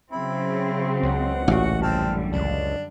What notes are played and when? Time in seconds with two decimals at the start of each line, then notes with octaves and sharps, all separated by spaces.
0.12 C#3 F#3 C4 E4
1.03 C#2 F#5
1.48 A1 A#2 F#4
1.82 F#2 D3 G3 C4 A5 F6
2.33 C#2 D4